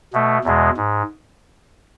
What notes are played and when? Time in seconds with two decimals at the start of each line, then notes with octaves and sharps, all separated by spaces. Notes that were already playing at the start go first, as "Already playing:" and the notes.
0.13 B2 A3
0.44 E2 B2 G#3
0.77 G#2